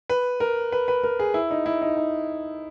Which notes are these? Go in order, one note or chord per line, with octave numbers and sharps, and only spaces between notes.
B4
A#4
B4
B4
A#4
G#4
E4
D#4
E4
D#4
D#4